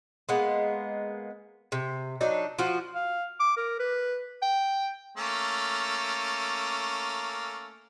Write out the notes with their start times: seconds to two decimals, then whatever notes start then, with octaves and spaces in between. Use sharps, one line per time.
0.29 G#3 A#3 B3
1.72 C3
2.21 F#3 D4 D#4
2.59 F3 F4 F#4
2.95 F5
3.40 D6
3.57 A#4
3.80 B4
4.42 G5
5.17 A3 A#3 C#4